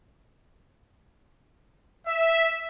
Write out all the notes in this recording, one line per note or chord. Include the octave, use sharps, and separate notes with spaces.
E5